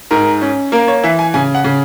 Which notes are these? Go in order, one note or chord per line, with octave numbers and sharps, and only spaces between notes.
G#2 A#4
C#4
A#3 A#4
C#5
E3 E5
G#5
C#3 G#5
F#5
C#3